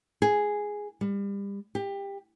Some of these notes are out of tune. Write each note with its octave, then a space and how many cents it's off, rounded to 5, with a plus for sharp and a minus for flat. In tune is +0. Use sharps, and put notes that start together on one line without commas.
G#4 +0
G3 +30
G4 +20